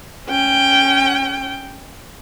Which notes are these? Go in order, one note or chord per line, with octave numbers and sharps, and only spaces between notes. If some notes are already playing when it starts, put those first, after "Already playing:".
C#4 G5